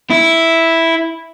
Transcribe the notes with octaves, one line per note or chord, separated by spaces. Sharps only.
E4